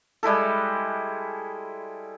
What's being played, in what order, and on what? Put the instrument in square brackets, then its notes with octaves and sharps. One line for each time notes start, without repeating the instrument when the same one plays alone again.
[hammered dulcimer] G3 G#3 E4 A4